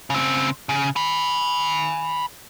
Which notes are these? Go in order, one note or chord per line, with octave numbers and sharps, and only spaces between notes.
C#3 C4
C#3
G#5 B5